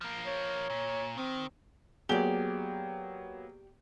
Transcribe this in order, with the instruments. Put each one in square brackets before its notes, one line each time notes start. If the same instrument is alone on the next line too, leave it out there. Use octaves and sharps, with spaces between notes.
[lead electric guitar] F3 A#3
[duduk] C#5
[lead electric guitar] A#2
[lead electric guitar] D#3 [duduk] C4
[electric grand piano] F#3 A#3 B3 [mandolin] G4 D5 [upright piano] G#4 G7